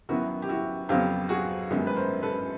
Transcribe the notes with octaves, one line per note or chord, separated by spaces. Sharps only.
F#2 D#3 F#3 B3 E4 F#4
G4
E4 F#4
F2 C#3 F#3 B3 F4 G4
F#4 G#4
G1 F#2 D#3 G#3 B3
B4
A#4 C5
A4 B4